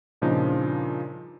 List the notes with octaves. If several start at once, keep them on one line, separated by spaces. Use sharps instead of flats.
G2 A#2 C#3 F3 D4 D#4